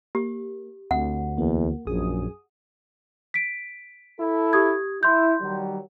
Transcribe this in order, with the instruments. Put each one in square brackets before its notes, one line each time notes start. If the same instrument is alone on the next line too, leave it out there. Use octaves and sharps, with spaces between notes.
[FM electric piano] A#3 [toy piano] G4
[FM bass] D2 [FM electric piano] C4 [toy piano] F#5
[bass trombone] E2 [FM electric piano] A#3
[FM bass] A#1 [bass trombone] F#2 [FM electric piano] G#4 G#5 D#6
[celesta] B6 D7
[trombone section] E4 A4
[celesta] G4 D#6 G#6
[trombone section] E4 [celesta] C6 G6
[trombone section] D#3 F#3 G3